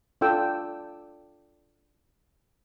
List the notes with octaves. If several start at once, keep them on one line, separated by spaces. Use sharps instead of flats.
D4 F4 A4 D5 G5 E6